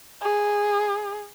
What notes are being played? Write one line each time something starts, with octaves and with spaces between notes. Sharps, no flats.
G#4